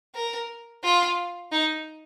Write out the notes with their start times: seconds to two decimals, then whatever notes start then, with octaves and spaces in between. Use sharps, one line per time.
0.15 A#4
0.84 F4
1.52 D#4